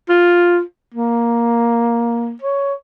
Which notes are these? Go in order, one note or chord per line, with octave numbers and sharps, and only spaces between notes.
F4
A#3
C#5